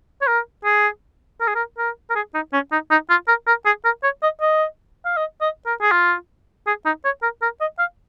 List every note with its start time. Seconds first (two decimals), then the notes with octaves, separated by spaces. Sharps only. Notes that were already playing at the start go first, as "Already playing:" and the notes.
0.21 C#5
0.27 A#4
0.65 G#4
1.41 A#4
1.48 G#4
1.56 A#4
1.78 A#4
2.10 A#4
2.16 G#4
2.34 D#4
2.53 C#4
2.72 D#4
2.91 D#4
3.10 F4
3.28 A#4
3.47 A#4
3.66 G#4
3.85 A#4
4.03 C#5
4.23 D#5
4.41 D#5
5.05 F5
5.17 D#5
5.41 D#5
5.66 A#4
5.81 G#4
5.91 F4
6.67 G#4
6.85 D#4
7.04 C#5
7.22 A#4
7.42 A#4
7.60 D#5
7.79 F5